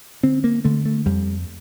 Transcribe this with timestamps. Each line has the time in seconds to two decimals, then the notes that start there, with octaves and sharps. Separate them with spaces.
0.23 D3 C4
0.44 A#3
0.64 D3 A3
0.85 A3
1.06 F2 G3